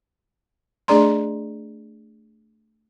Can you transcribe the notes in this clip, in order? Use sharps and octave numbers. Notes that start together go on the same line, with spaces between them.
A3 D4 G#4 D5 A#5 C6